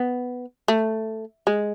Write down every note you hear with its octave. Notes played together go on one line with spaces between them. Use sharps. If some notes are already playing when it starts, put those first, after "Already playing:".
Already playing: B3
A3
G#3